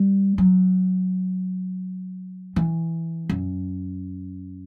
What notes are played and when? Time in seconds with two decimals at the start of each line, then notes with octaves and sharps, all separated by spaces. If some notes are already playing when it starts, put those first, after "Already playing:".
Already playing: G3
0.38 F#3
2.56 E3
3.29 F#2